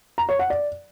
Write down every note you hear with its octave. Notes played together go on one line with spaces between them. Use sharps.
A#5
C#5
F#5
D5